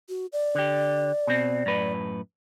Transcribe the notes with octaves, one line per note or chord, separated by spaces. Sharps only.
F#4
D5
D3 G4
B2 C4
F#2 A2 B4